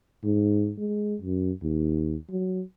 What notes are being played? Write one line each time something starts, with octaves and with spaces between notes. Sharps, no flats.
G#2
G#3
F#2
D#2
F#3